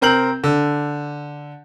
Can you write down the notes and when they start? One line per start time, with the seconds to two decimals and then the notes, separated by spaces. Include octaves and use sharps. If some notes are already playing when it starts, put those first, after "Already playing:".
0.02 C3 C4 A#4 G6 F#7
0.44 D3